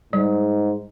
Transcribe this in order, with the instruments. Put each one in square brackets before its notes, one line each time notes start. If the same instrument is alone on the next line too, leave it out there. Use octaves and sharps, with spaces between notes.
[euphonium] G#2 [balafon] G3 D5